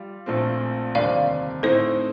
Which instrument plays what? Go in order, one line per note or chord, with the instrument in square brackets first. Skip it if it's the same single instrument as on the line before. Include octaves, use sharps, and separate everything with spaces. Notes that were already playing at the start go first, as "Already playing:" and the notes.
Already playing: [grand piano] G3 F4
A#1 A#2 A3 C4
[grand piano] F1 D#2 D3 G3 C4 [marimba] D5 F5
[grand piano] A2 A3 C4 D#4 [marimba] A4 C5